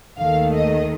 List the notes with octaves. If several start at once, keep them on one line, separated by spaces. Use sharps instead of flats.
D#2 D#3 A3 F5
D#5